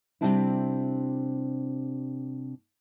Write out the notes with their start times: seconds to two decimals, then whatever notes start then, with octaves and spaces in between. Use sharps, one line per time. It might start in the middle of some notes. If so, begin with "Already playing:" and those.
0.21 C3 G3 G#3 C4 D4 E4